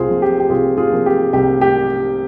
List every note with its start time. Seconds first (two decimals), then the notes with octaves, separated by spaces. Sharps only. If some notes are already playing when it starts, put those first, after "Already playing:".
Already playing: C2 F4 G#4 C5
0.09 C3 F3 A#3
0.22 G4
0.40 G4
0.49 C2 F4 G#4
0.77 F4 G#4
0.92 C3 F3 A#3
1.06 G4
1.33 C2 G4
1.61 G4